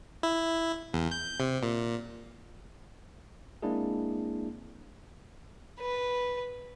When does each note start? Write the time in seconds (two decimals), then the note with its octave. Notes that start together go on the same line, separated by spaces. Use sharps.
0.23 E4
0.94 E2
1.12 G6
1.40 C3
1.63 A#2
3.62 G#3 A#3 C4 D4 E4 G#4
5.80 B4